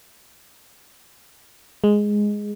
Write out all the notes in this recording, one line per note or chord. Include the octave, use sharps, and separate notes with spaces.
G#3